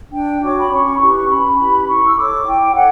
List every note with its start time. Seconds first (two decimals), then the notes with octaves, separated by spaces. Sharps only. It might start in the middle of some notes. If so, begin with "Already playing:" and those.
0.13 D4 G5
0.42 F#4 C#5 D6
0.59 B5
0.71 C#4 C#6
0.94 B5
1.00 E4 G4 B4 C#6
1.29 C#4 B5
1.58 E4 G4 B4
1.87 E4 C#6
2.06 E6
2.17 A4 C#5 D6
2.46 E4 G5
2.75 A4 C#5 F#5